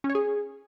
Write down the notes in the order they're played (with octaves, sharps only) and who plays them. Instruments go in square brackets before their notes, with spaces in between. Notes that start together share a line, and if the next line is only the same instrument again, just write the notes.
[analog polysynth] C#4
C#5
G#4